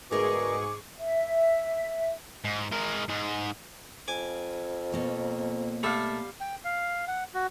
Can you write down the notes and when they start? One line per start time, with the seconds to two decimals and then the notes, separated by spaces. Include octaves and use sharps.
0.11 D2 G#2 B2 G#4 A#4 D5 C#6 D6
1.01 E5
2.45 G#2
2.72 G#3 A#4
3.08 G#2 G#3
4.08 F2 G#5 D6
4.92 B2 A#3 C#5
5.83 G3 A3 A4 F5
6.40 G5
6.64 F5
7.08 F#5
7.34 F#4